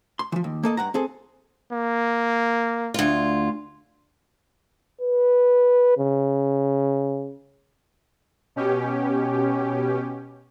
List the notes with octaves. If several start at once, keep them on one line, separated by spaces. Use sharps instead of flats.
C6
E3 F3
D#2
A#3 A4 D#5
G2 F#5 A#5
C4 G#4 A4
A#3
D2 F4
B4
C#3
B2 C#4 G4